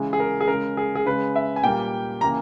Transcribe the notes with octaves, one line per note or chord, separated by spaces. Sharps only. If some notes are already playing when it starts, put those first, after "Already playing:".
Already playing: C#3 E3 G#3
G#4
A#4
G#4
C#3 G#3 A#4
G#4
G#4
C#3 G#3 B4
E5
G#5
A#2 G3 A#3 G5
C#3 E3 A#3 A#5